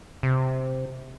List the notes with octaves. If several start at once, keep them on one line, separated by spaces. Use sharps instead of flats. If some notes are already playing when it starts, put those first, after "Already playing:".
C3